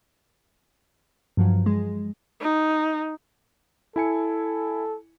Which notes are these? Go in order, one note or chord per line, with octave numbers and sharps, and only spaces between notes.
G2 F3 F#3
G#3
D#4
E4 A4 G#5 C#7